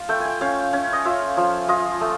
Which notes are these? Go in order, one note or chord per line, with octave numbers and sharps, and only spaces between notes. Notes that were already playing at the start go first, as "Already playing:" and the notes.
Already playing: F4
A3 G5
G#5
G5
C#4 F5
C#4
D#5
F4 E5
F3
F4 D#5
A3